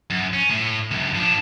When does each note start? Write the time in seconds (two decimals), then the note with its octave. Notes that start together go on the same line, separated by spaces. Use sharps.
0.10 F#2
0.33 C#4
0.50 A2
0.91 C#2 F#2
1.15 F3 D4